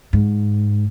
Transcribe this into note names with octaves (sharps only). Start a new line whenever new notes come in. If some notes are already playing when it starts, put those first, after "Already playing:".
G#2